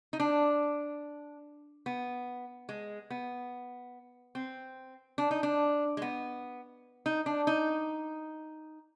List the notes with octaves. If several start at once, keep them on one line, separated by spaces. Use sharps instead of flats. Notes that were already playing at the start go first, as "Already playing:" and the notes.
D#4
D4
B3
G#3
B3
C4
D4
D#4
D4
G#3
B3
D#4
D4
D#4